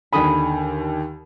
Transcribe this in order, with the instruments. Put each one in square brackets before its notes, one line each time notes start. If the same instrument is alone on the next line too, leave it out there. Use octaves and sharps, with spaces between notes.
[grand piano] D#2 D3 G#5 [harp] B5 D#6